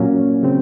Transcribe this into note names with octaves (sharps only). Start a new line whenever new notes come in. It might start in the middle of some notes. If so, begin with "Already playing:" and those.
Already playing: A#2 F#3 A#3 C#4
C#3 F#3 C4